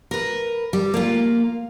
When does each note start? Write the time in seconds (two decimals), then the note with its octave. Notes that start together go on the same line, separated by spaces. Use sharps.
0.11 A#4 B4
0.73 G3
0.94 A#3 F4